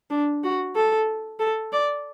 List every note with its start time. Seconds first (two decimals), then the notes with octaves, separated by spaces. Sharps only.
0.10 D4
0.43 F#4
0.75 A4
1.39 A4
1.72 D5